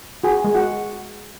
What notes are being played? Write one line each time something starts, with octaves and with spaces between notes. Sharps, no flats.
F#4 G#4 G#5
G#3
F#4 F#5